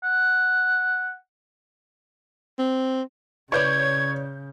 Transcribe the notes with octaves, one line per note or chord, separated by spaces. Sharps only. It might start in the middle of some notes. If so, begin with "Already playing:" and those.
F#5
C4
C#3 E4 B4 C#5 D5 G6 G#6